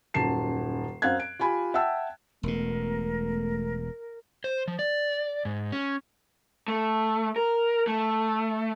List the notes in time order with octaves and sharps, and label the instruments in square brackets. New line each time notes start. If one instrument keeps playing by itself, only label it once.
[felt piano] D#1 F#2 A5 C7 E7
F#2 C4 F5 F#5 F#6 G#6
D7
F4 G4 G#5 B5
E5 F#5 G5 A5 E6
[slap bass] E1 B2 [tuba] A3 [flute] A#4
[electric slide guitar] C5
F3
D5
G#2
C#4
[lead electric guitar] A3
A#4
A3